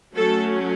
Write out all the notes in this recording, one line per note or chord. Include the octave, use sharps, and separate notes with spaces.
F#3 A3 C#4 A4